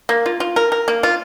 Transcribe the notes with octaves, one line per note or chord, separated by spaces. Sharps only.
A#3
F4
F4
A#4
A#4
A#3
F4